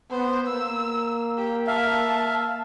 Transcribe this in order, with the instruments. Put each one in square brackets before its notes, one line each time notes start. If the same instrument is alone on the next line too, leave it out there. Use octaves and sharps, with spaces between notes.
[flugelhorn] B3 [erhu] C5
[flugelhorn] A#3 [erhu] E6
[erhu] G4
[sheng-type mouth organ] E5 F5 [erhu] A5